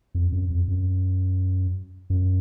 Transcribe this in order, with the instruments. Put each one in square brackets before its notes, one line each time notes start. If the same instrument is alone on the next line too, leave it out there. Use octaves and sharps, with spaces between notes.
[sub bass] F2
F#2
F2
F#2
F#2